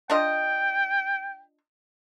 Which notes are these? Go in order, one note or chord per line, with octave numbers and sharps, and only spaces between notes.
D4 F4 D#5 G5